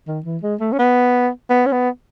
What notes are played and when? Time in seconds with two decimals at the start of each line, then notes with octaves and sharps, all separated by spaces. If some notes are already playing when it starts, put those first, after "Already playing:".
0.08 D#3
0.25 E3
0.43 G#3
0.60 A3
0.73 C#4
0.79 B3
1.50 B3
1.66 C#4
1.72 B3